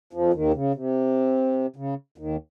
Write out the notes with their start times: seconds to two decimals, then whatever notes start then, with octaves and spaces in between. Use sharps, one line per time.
0.13 F2 F3
0.34 D#2 D#3
0.54 C#3
0.75 C3
1.76 C#3
2.18 D#2 D#3